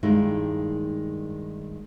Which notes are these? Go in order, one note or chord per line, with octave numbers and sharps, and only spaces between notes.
G2 D#3 G#3 A#3 D#4 E4